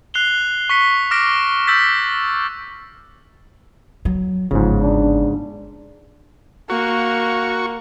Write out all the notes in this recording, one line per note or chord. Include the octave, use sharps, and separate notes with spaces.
F#6 C7 F7 G7
C#6 B6 C#7
D6 F6 A#6 D7
E6 G6 A6 B6
F#3
G1 G#2 C#3 F3
D4
A#3 F#4 C#6